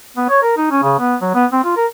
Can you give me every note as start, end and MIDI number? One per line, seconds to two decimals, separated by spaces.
0.17 0.28 59
0.29 0.42 73
0.43 0.57 70
0.57 0.68 63
0.71 0.79 61
0.83 0.95 49
0.99 1.16 59
1.22 1.30 54
1.35 1.46 59
1.52 1.61 60
1.64 1.74 65
1.76 1.86 70